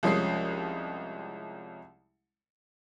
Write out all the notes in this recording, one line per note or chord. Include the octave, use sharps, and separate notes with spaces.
C2 F3 G#3 C#4 D#6 C7